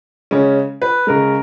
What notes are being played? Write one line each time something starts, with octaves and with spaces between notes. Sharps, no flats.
C#3 G#3 C#4
B4
C#3 G#3 A#4